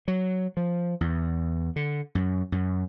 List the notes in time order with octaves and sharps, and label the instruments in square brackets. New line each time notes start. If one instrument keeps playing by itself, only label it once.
[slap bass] F#3
F3
E2
D3
F#2
F#2